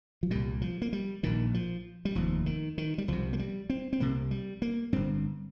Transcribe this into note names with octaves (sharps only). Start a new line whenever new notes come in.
F3
C2 A#2 G3
F3
A#3
G3
A#1 A#2 D#3
F3
G3
F1 D#2 F3
D#3
D#3
G3
C2 C3 F3
A#3
G3
C4
C4
C2 C3 A#3
G3
A#3
G1 G2 C4